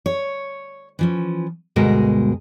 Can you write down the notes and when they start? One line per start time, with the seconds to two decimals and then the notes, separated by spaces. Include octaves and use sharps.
0.06 C#5
0.99 E3 F3 C#4
1.76 D2 G2 B2 G#3 G#4 A#4